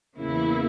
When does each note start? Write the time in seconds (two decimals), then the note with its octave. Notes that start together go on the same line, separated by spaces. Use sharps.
0.15 E2 C#3 E3 A#3 E4